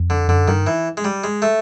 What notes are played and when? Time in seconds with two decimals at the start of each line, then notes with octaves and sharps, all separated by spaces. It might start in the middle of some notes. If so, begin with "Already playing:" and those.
Already playing: F2
0.10 D3
0.28 F#2 D3
0.48 G2 D#3
0.67 E3
0.97 G#3
1.04 G3
1.24 G#3
1.42 A3